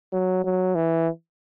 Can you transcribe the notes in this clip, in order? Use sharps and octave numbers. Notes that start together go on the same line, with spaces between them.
F#3
F#3
E3